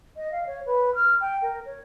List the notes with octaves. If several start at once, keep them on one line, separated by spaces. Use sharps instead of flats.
D#5
F5
C#5
B4
F6
G5
A#4
C#5